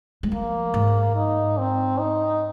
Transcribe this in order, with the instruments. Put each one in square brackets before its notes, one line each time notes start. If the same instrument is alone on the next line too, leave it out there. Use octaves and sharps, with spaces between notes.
[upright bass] G#3
[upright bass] F3 [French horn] A#3
[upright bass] G#2
[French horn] D#4
C4
D#4